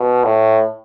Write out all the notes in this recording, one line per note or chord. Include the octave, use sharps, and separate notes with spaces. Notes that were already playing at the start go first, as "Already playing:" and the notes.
Already playing: B2
A2